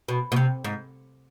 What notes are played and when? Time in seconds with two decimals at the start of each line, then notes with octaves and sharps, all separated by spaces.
0.08 B2
0.32 B2
0.36 C3
0.64 G#2